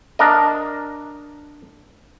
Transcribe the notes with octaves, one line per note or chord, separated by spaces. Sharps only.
D4 A#4 D#5